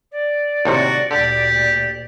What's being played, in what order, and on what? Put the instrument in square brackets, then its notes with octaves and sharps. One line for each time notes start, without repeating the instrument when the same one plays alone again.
[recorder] D5
[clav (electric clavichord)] D#2 A2 C3 [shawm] F#4
[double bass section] D2 A#2 [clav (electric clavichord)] D3 [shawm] G4